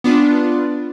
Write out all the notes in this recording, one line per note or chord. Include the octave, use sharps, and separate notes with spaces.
B3 D4 F4